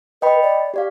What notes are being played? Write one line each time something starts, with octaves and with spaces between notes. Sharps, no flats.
B4 D#5 G5 B5
D5
G4 D5 F5